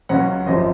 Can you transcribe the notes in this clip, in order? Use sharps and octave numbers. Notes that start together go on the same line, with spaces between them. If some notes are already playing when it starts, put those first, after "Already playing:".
C#2 C#3 F#3 C#4 F#5
G#1 F#2 F3 D#5